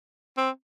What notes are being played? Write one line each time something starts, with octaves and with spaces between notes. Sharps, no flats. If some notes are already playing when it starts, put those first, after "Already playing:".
C4